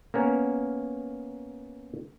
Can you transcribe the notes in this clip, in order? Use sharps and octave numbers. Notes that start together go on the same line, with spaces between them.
A#3 B3 C#4 A#4